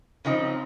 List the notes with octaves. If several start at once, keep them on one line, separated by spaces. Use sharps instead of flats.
C#3 F3 C4 D#4